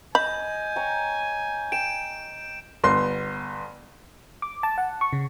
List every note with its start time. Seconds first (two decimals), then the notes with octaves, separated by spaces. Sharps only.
0.15 D#5 G#5 B5 G6
0.76 C#5 G5 A#5
1.72 G5 D7 E7
2.84 G1 B3 C6
4.42 D6
4.63 A5
4.78 F#5
5.01 C#6
5.13 C#3